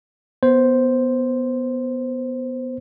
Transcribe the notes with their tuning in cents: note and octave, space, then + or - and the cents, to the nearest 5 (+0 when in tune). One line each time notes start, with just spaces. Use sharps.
B3 +0 C5 +0